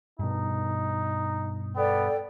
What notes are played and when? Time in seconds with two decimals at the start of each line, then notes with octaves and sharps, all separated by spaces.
0.19 G2 B2 D#4
1.76 B3 A4 D5 G5